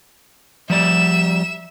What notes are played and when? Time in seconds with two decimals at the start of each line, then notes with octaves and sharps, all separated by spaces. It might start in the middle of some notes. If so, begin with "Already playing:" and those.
0.70 F3 G3 D5 E5 E7